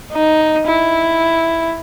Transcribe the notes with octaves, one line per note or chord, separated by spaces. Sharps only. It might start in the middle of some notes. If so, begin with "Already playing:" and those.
D#4
E4